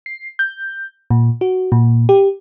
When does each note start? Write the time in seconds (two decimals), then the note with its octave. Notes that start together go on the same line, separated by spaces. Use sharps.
0.06 C7
0.39 G6
1.10 A#2
1.41 F#4
1.72 A#2
2.09 G4